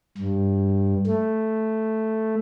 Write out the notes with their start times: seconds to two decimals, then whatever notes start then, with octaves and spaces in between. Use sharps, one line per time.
0.18 G2
1.06 A3